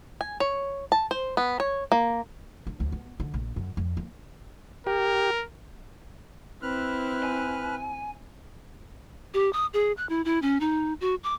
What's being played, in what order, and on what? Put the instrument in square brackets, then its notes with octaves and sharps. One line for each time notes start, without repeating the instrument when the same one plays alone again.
[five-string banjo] G#5
C#5
A5
C5
B3
C#5
A#3
[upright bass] D4
D2
B3
D3
A#1
F#2
F2
A#3
[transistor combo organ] G4 [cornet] A#4
[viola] C4 E4 [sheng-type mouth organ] B4 F6 F#6
[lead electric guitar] G#5
[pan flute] G4
D#6
G#4
F#6
E4
E4
C#4
D#4
F#4
D6